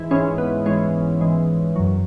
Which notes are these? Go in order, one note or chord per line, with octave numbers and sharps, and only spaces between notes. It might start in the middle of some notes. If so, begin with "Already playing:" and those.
Already playing: G#2 E3 G#3 E4
G#2 E3 G#3 C#4
B3
G#2 E3 G#3 C#4
G#2 E3 G#3
F#2 F#3